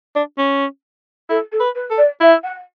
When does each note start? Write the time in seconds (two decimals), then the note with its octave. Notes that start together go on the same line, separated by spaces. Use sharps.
0.16 D4
0.38 C#4
1.29 E4 A4
1.52 A4
1.60 B4
1.75 B4
1.91 A4
1.97 D5
2.21 E4 E5
2.43 F#5